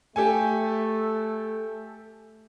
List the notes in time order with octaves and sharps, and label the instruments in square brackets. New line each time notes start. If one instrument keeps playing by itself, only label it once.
[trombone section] A3 [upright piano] G4 A4 G#5